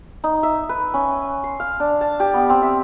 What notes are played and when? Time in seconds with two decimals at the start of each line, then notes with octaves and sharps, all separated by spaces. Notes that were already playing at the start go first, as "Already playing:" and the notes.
0.24 D#4
0.43 E5
0.69 B4
0.94 C#4
1.44 C6
1.60 F5
1.80 D4
2.01 A5
2.20 G4
2.34 B3
2.50 C4
2.62 E5